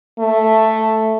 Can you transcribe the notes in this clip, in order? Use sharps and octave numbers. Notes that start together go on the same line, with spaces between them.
A3